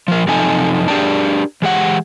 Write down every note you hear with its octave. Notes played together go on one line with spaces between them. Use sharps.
F3 A#4
F#2 C3 F3 D#4 A4 G#5
D4 G4 G#4 A#4 D5 A5
E3 G#3 G4 F#5